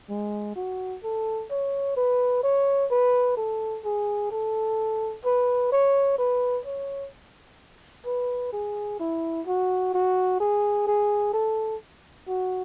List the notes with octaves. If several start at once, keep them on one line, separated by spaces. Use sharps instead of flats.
G#3
F#4
A4
C#5
B4
C#5
B4
A4
G#4
A4
B4
C#5
B4
C#5
B4
G#4
E4
F#4
F#4
G#4
G#4
A4
F#4